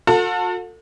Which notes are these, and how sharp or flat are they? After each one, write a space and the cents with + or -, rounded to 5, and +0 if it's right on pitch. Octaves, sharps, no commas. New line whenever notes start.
F#4 -45 A4 +25